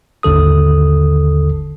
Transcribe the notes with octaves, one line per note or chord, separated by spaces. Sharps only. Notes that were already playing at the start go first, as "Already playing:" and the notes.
G#1 D#2 D3 A4 D#6